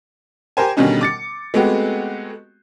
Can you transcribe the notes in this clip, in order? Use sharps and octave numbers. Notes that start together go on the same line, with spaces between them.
G4 A#4 C5 G#5
B2 D3 D#3 G3 C#4 D#4
D6 A6 C#7
G#3 A3 B3 C4 F#4 G4